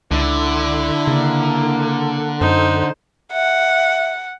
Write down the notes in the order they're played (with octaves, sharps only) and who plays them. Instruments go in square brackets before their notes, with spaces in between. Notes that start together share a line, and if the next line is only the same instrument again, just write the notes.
[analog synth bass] C#2 [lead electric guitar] D3 [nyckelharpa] E4
[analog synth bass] C#3 [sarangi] A#3
[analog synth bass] F#2 [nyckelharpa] D#4 [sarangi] C5
[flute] E5 [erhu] F#5